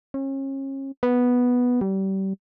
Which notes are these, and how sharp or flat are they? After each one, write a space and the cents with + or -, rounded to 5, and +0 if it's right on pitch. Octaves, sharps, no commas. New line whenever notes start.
C#4 -35
B3 -5
G3 -30